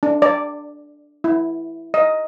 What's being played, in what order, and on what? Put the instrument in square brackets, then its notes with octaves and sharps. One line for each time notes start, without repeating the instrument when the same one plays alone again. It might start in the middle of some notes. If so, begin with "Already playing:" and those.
[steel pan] D4
D5
E4
D#5